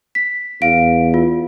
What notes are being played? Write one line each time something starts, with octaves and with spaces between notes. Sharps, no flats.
B6
E2 F5 D7
F4